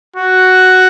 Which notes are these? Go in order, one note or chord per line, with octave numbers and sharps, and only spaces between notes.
F#4